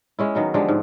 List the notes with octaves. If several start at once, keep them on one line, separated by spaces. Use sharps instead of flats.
G#3 C#4 E4
D#3 F#3 B3
D3 F3 G#3 G4
G#2